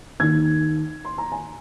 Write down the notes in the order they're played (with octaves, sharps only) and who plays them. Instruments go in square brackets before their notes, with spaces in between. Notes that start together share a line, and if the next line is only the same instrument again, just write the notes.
[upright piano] D#2 D#3 G#6
C6
A#5
G#5